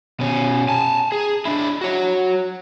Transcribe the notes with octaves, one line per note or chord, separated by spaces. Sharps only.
B2 C#4
G#5 A5
G#4
D4 E4
F#4 C#5